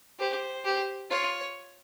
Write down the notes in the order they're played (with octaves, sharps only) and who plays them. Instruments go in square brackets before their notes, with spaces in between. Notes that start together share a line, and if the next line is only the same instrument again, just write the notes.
[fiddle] G4 [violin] C5
[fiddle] G4
[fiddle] F4 [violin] C#5